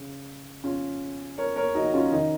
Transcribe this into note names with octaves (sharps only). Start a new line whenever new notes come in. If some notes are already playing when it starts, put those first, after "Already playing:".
Already playing: C#3
C#4 F4
A#4 C#5
A#4 C#5
D#4 F#4
C#4 F4
D#3 D#4